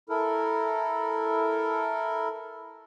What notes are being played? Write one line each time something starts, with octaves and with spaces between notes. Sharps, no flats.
E4 A4 A#4